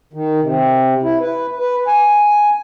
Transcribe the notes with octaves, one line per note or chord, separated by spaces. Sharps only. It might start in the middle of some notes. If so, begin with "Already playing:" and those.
D#3
C3
E4
B4
B4
G#5